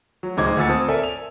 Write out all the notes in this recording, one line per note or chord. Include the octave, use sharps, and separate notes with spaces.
F#3
D1 C#2 D#4 C5 D6 G#6
D2 A#2 G#5 E6 A6 C#7
C4 A5 D#6
A4 A#4 D5 E5 G#5
F7